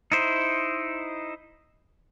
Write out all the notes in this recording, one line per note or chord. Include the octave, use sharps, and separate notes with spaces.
D#4 E4 C5